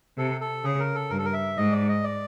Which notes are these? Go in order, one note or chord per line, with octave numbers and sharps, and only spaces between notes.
C3 A4
A4
C#3 G#4
A#4
A4
G2 A#4
A4
A#4
E5
G#2 D#5
D5
D#5
D5